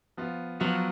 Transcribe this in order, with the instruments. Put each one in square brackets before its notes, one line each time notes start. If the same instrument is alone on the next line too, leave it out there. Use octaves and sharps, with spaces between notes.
[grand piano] F3 B3 F4
[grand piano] F3 B3 F4 [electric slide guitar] F#3